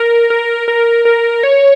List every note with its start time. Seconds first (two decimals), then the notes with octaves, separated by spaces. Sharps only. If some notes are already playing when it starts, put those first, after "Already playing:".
Already playing: A#4
0.30 A#4
0.68 A#4
1.05 A#4
1.43 C#5